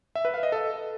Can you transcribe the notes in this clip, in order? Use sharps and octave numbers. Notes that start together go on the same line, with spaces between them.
E5
B4
F5
D#5
A4